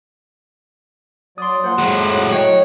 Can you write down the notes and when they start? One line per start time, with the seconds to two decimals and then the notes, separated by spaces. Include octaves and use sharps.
1.38 F#3 D5 C6 D#6
1.64 F3 A#3 C5 F#5 C6
1.78 A2 F#3 G#3 F#4 F#6
2.32 C#5 D#5 G5